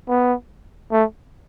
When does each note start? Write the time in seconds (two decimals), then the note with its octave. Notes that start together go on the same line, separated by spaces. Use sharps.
0.09 B3
0.91 A3